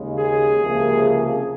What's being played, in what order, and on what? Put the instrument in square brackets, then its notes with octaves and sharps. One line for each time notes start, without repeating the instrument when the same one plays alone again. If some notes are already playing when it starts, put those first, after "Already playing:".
Already playing: [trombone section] D#2 C#3 G#3
G#4
C#2 C3 F3 A#3